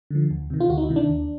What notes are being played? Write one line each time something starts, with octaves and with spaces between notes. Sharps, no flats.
D3 F3
D2
C3 D#3
F4
D2 F#4
D#4
E4
C3 D#3
D4
D#2